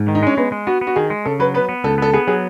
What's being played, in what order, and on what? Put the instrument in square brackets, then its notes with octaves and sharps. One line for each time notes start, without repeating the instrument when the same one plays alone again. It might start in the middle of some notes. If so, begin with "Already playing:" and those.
Already playing: [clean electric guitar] G#2
D#3
[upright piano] D#4
[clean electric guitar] G#3 [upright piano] C#4
[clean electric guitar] G#3 [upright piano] B3
[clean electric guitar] G#3
[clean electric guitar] B3 [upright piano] F#4
[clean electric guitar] B3
[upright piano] F#4
[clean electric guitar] D#3 [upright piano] G#4
[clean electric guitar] G#3
[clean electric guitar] C#3 [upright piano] A4
[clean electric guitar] F#3 [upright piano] B4
[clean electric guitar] B3 [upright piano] B4
[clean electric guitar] B3
[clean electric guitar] C#2 [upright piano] A4
[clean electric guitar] B3 [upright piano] A4
[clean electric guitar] B3 [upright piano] G#4
[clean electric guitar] F#3 [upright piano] G#4